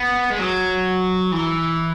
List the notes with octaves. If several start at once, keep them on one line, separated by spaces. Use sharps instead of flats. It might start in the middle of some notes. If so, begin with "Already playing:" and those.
Already playing: B3
G#3
F#3
E3